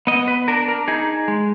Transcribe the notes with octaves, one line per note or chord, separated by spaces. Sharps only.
B3 D#5
B4
D4 A#4
A#4
D#4 G#4
G#3